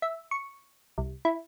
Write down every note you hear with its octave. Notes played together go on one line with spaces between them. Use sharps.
E5
C#6
C2
E4